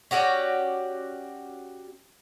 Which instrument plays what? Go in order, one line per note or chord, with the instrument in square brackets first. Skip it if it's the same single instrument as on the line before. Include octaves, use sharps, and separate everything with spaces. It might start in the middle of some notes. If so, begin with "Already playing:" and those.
[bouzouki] C#4 F#4 G4 D5